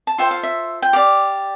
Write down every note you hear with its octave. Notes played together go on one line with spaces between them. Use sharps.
A5
F4 A4 C5 E5 G5
F5
E5
G5
G4 D5 F5